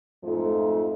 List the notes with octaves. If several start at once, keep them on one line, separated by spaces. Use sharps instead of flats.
F2 G#2 F3 A3